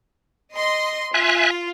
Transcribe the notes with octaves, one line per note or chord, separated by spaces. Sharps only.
D#5 C6
F4 E5 G#5 F#6